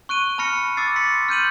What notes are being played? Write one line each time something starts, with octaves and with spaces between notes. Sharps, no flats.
C#6 F#6 D7 D#7
A5 B5 F6 A#6 C#7
D6 E6 A6 C7
C6 B6 C#7
F6 G6 D#7 F#7